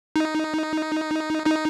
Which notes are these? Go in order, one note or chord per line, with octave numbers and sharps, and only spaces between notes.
D#4
D#4